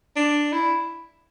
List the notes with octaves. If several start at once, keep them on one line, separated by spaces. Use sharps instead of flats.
D4
E4